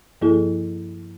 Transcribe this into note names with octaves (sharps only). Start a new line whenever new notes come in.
G2 F3 A#3 E4 G#4 A4